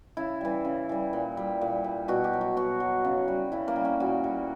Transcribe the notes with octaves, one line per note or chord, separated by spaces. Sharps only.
C#3 E4
E3 G3
C#3
E3 G3
A#2
G3
A#2
G3
B2 F#4
G4
F#3
F#4
B2 F#4
F#3
C#3
G3
C#3 E4
A#3
G3
C#4
A#2 F#4
G3